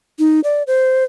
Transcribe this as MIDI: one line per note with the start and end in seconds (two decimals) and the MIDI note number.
0.19 0.40 63
0.44 0.63 74
0.67 1.04 72